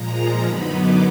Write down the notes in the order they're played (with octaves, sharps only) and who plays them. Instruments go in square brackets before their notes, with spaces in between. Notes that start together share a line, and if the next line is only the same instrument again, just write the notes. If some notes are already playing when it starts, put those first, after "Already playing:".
Already playing: [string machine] A#2 F3 G#3 A#5
F#2 D3 F#3 B3 D#4 B5
D6